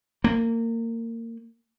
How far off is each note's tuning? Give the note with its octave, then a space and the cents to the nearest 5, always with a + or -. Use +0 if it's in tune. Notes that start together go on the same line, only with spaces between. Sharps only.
A#3 -25